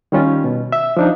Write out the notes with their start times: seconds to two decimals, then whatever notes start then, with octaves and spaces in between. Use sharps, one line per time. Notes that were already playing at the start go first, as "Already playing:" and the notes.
0.12 D#3 G3 C#4 F4
0.44 B2
0.72 E5
0.97 F3 D4 D#4